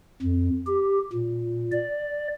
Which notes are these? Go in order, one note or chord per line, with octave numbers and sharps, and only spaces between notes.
F2
G4
A#2
D5